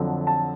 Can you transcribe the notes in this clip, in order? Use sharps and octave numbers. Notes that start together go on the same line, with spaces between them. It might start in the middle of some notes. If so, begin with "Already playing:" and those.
Already playing: F2 D3 F#3
A5